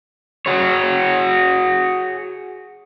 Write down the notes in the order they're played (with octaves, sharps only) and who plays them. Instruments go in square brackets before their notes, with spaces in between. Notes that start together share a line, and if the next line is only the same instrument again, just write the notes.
[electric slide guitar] F#4 G#4 C#5